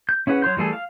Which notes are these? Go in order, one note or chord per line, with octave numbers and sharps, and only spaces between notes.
G6
C#4 E4 G#4 B4 F#5
F#3 C#5 C6 G6
E3 G3 A3 G#4 A4
F5